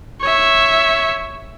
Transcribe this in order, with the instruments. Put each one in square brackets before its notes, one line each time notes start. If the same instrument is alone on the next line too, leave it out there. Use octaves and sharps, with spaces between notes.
[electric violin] C#5 E5